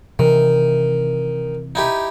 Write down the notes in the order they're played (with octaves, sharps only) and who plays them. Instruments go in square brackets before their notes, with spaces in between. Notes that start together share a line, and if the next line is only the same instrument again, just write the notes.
[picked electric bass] C3 E3 [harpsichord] D#3
[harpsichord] D#4 E4 G4